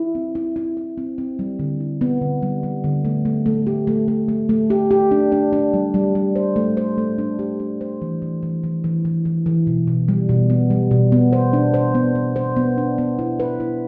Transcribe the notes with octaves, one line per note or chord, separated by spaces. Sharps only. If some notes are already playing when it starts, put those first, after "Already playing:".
Already playing: E4
C4
E4
E4
E4
C4
C4
G3
D3
E4
B3
D3
G3
G3
D3
A3
A3
A3
G4
A3
A3
A3
A3
G4
G4
D4
D4
D4
G3
G3
G3
C5
A3
C5
A3
D4
G4
D4
C5
E3
E3
E3
E3
E3
E3
E3
E3
B2
B2
G3
B2
B3
G3
B2
B3
C5
D4
C5
B3
B3
C5
B3
D4
B3
E4
B4
E4